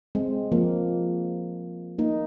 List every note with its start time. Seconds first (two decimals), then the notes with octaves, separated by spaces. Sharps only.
0.15 G#3 C4
0.52 F3 A#3
1.98 A#3 D#4